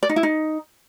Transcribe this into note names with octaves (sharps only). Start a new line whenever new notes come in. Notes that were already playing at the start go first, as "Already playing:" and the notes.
D5
D#4
E4
D#4